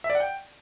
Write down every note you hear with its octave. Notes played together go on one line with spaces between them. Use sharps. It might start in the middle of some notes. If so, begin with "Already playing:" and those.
E5
D5
F#5
G5